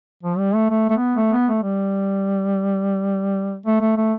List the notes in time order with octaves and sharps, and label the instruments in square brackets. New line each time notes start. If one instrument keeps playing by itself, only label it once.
[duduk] F3
G3
A3
A3
A3
B3
A3
B3
A3
G3
A3
A3
A3